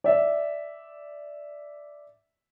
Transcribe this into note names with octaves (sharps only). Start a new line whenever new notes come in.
D5 E5